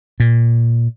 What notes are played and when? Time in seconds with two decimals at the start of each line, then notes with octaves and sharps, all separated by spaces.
0.20 A#2